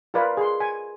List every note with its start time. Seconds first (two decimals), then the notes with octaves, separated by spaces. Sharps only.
0.14 F4 A#4 B4 D5 F5
0.37 G#4 C6
0.60 G#5